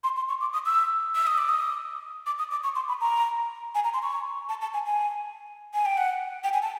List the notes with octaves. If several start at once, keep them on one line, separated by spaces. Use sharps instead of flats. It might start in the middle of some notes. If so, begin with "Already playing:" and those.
C6
C6
C#6
D6
D#6
E6
E6
D#6
D6
D#6
D6
D#6
D6
C#6
C6
B5
A#5
G#5
A#5
C6
C#6
A5
A5
G#5
G#5
G#5
G5
F#5
G5
G#5
A5